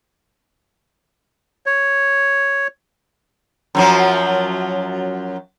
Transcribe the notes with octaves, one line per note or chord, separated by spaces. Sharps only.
C#5
F#2 F3 F#3